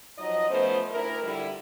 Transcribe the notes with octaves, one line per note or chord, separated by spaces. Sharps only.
F3 F#3 D#4 D#5
F3 A3 B3 C#4 C5
D2 E4 A#4
D3 G3 D4 E4